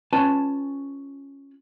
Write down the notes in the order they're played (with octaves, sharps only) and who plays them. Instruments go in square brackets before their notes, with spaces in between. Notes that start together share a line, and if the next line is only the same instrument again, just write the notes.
[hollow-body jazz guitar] C#4 F4 B4 G#5 A5